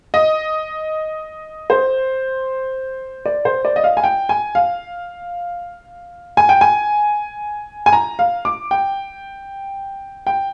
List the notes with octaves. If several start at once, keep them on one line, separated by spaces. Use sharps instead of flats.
D#5
C5
D5
C5
D5
D#5
F5
G#5
G5
G#5
F5
G#5
G5
G#5
G#5
A#5
F5
D6
G5
G5